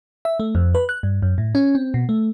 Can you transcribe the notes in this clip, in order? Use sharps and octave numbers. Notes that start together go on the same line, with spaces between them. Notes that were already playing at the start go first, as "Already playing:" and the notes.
E5
A3
F2
B4
F#6
G2
F#2
A2
C#4
C4
B2
A3